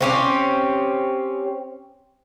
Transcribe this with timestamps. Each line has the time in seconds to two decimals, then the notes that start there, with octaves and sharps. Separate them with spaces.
0.01 C4 C#4 G4